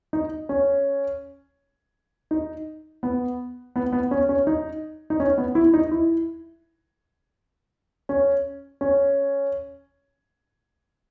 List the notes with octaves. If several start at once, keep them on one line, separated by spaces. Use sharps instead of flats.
D#4
C#4
D#4
B3
B3
B3
C#4
C#4
D#4
D#4
C#4
B3
E4
D#4
E4
C#4
C#4